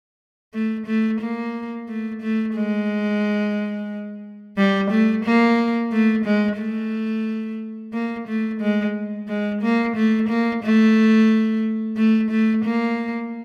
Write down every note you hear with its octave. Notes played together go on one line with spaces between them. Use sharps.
A3
A3
A#3
A3
A3
G#3
G3
A3
A#3
A3
G#3
A3
A#3
A3
G#3
G#3
A#3
A3
A#3
A3
A3
A3
A#3